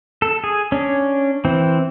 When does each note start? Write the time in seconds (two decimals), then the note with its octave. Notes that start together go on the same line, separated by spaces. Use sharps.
0.22 A4
0.44 G#4
0.72 C#4 D4
1.45 E3 C4